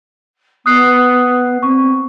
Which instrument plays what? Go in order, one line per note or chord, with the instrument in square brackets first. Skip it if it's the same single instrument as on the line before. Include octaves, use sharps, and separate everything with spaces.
[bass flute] B3 [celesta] D#6 F#6 C7
[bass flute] C4 [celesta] C#6